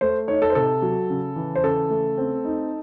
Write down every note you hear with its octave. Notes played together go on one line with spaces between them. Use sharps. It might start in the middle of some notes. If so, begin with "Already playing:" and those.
A3 C5
D#4 C#5
A4
C5
C3 A4
F#3
C#3
E3
C5
C#3 A4
A3
C4
D#4